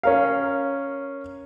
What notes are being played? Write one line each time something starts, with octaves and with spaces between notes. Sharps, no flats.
C#4 A#4 F5